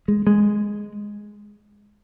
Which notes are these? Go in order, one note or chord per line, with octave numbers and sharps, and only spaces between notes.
G#3
G#3